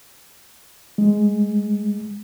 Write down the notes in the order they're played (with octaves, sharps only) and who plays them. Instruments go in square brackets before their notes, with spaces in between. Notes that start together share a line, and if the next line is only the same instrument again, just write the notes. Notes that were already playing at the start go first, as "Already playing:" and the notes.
[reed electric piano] G#3